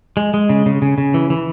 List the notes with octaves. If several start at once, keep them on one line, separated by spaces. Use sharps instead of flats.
G#3
G#3
C#3
C#3
C#3
C#3
E3
E3